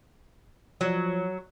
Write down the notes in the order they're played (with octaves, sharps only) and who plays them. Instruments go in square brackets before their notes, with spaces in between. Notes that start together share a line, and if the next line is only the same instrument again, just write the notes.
[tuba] F3 [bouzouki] F#3